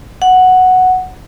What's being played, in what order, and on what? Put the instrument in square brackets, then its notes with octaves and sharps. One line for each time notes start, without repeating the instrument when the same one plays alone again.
[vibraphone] F#5